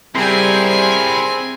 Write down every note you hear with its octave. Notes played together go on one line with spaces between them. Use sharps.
G3 C4 E4 G#4 A#4 G#5